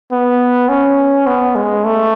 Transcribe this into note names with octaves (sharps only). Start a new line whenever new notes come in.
B3
C#4
B3
G#3
A3